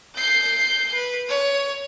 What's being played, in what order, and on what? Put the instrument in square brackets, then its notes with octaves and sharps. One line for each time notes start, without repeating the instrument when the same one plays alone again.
[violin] G6 C7
B4
C#5